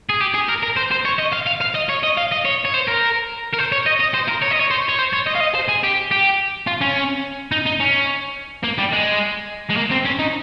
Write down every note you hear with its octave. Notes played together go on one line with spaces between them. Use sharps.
G#4
G4
G#4
A#4
A#4
C5
C5
C#5
D#5
F5
F5
F5
D#5
C#5
D#5
F5
D#5
C#5
C#5
C5
A#4
A#4
C5
C#5
D#5
D#5
C5
A#4
C#5
D#5
C#5
C5
C#5
C5
C#5
D#5
F5
D#5
C5
G#4
G4
G4
F4
C#4
D#4
D#4
C#4
A#3
G3
G#3
G#3
A#3
C4
C#4
D#4